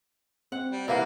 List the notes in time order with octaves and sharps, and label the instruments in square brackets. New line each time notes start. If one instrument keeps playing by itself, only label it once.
[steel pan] C4 [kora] F#5
[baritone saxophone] G3
[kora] C3 E3 [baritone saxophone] A#3 [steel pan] B4 F5 F#5